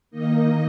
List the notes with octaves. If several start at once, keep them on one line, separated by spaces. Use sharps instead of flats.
D#3 A#3 D#4 D#5